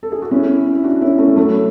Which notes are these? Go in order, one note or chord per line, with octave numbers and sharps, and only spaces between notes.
A4
G#4
F#4
C#4 E4
E4
D4 F#4
C#4 E4
A3 C#4
F#3 A3